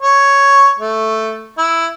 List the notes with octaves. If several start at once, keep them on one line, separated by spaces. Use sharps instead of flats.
C#5
A3
E4